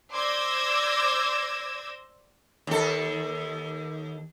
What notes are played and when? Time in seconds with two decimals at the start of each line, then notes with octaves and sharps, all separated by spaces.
0.12 C5 D5 D6 E6 G#6 A#6
2.67 D#2 A4